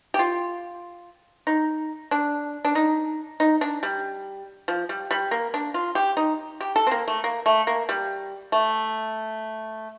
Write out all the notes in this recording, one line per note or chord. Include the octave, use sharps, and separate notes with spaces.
G4
F4
D#4
D4
D4
D#4
D#4
D4
G3
F3
G3
G3
A#3
D4
F4
G4
D#4
G4
A4
C4
A#3
A3
A#3
A3
A#3
G3
A3